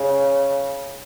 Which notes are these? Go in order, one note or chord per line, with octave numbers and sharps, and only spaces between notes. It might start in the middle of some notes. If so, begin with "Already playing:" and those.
Already playing: C#3